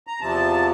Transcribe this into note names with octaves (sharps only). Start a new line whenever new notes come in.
A#5
E2 C3 F3 A5